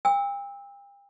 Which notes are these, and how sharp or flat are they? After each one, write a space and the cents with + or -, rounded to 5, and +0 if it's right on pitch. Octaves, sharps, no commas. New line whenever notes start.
G5 +40 E6 -15